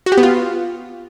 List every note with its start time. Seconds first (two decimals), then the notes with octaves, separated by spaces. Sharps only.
0.06 F#4
0.12 G4
0.17 B3
0.23 F4